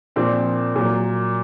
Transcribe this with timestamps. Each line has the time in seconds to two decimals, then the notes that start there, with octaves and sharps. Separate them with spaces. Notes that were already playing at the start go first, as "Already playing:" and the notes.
0.16 A#2 F3 C4 D4
0.76 A#2 F#3